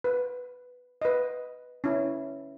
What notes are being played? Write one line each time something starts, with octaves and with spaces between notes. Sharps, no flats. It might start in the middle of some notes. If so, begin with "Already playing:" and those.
B4
B4 D#5
C#4 E4